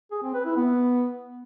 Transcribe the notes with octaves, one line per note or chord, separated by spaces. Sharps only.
G#4
C4
B4
E4
B3